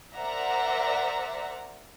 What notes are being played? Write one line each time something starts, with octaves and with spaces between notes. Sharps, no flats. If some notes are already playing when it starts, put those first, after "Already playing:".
A#4 C5 D5 E5 F#5 A#5